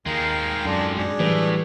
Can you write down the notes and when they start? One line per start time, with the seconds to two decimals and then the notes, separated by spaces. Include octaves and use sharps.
0.06 D#2 D#3 G#3 A#4 F5 G5
0.65 F#2 D4 F4 A4
0.96 G#1 D4 G#4
1.20 A2 E3 F#3 G3 A3